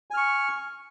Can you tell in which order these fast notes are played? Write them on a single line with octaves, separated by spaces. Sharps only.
G#5 F6 C#6